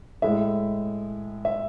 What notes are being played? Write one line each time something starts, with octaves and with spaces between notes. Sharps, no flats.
A2 G#3 E5
E5